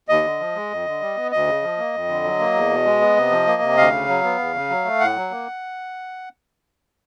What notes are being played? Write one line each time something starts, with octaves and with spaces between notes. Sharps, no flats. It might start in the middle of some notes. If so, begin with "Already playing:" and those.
D#2 D#5
D3
F3
G#3
F2
D3
G3
B3
D2 D#5
C#3
F3
A#3
F2
D3
F#3
A#3
E2
B2
G#3
B3
C3
F3
A#3
C3
D2 F5
C#3
F#3
B3
E2
C#3
F#3
A3
A2 F#5
F#3
A#3